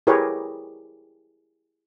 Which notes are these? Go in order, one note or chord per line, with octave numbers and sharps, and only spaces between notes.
E4 G4 G#4 A#4 B4 C#5